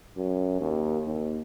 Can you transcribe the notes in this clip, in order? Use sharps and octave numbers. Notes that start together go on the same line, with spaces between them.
F#2
D#2
D#2